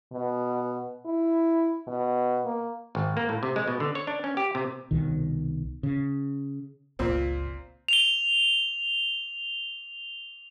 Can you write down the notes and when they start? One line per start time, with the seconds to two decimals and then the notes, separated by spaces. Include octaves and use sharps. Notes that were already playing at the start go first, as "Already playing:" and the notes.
0.12 B2
1.06 E4
1.88 B2
2.45 A#3
2.95 G#1
3.17 A#3
3.29 A2
3.43 C3
3.56 G#3
3.68 B2
3.80 D3
3.95 C#5
4.07 D4
4.24 C#4
4.37 G4
4.55 C3
4.91 C2 B2 D#3
5.83 C#3
6.99 G1 C#2 A#2 C4
7.88 F7 G7